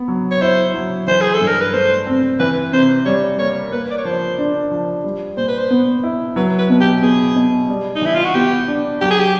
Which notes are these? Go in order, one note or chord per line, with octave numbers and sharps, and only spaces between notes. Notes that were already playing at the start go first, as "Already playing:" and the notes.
Already playing: B3
F#3
C#5
E4 C5
F#3
E3 C5
G#4
A4
G2
A#4
B4
A3 C5
C4
E3 B4
C3 C5
G3 C#5
A#3 C#5
A#3 B4
D5
C#5
F3 C5
D4
F3
G3
A#2 C5
B4
C5
B3
E4
F#3 B4
B4
B2
G4
B3 G#4
B2
G3
D#4
E3 E4
F4
F#4
B3 G4
D4
F#3 G4
G#4
G4